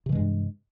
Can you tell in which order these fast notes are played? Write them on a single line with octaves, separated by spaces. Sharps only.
C3 E3 G#3 G2